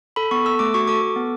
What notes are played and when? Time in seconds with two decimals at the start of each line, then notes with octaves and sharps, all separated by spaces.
0.16 A4 B5
0.31 B3 C#6
0.45 A4 E6
0.59 A3 D6
0.74 F#4 C#6
0.87 A4 D6
1.02 A4
1.16 B3